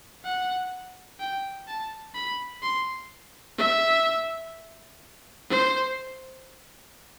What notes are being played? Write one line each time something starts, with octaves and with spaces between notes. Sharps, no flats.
F#5
G5
A5
B5
C6
E5
C5